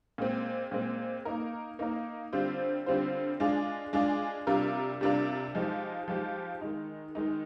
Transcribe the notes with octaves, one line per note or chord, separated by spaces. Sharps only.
A#2 G#3 C4
A#2 G#3 C4
A#3 D#4 A#4
A#3 D#4 A#4
D3 G3 C4 F4 C5
D3 G3 C4 F4 C5
G#3 D4 F4 G#4
G#3 D4 F4 G#4
C3 G3 D4 F4 A#4
C3 G3 D4 F4 A#4
F3 G#3 D#4 G4
F3 G#3 D#4 G4
D#3 G#3 D#4
D#3 G#3 D#4